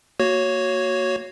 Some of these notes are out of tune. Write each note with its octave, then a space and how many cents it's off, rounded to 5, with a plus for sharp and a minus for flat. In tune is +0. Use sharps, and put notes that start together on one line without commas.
A#3 +0 F#4 +0 C#5 +0